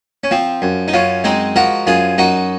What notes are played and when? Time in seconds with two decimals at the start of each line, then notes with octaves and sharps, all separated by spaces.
0.24 C#4
0.31 F3 C4
0.62 F#2
0.88 D#4
0.93 F#2 C#4 F4
1.24 G#3 C4 D#4
1.56 F3 F#4 A#4
1.87 F#2 F4 G#4
2.18 F#2 D#4 F#4